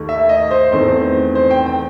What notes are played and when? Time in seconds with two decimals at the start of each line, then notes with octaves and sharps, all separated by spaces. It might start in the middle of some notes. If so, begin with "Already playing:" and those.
Already playing: D#2 D#3 A3
0.09 E5
0.29 D#5
0.51 C5
0.72 E2 D#3 A3 C4 C5
1.35 C5
1.51 G5
1.66 G5